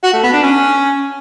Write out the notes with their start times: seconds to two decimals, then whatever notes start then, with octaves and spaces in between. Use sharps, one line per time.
0.03 F#4
0.13 A3
0.23 B3
0.33 D4
0.43 C#4